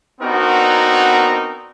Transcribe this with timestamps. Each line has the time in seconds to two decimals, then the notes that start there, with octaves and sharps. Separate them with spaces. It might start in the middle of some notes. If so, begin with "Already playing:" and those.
0.21 B3 C4 D4 D#4 F#4 A#4